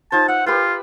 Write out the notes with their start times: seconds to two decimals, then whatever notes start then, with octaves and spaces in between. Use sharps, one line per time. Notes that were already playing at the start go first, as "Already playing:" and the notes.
0.12 D#4 F4 C5 A5
0.28 E5 F#5
0.46 F4 G4 A#4 B4